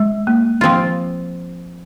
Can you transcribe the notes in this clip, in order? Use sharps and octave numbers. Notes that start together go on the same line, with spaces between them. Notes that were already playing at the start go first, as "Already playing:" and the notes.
Already playing: G#3
A#3
F3 C4 F4